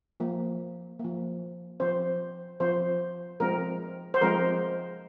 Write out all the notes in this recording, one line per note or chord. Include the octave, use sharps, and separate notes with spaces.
F3 A#3
F3 A#3
F3 C4 C5
F3 C4 C5
F3 G#3 C4 A#4
C5
F3 G#3 C4 A#4